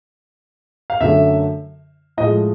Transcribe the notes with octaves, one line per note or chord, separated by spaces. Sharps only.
F5
F#2 D3 F#3 A3 E5
A2 F3 G#3 D#5